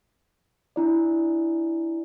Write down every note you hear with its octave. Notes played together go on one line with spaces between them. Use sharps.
D4 E4 D5